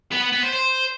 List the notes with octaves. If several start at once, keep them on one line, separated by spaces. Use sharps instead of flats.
B3
B3
B3
C5
C5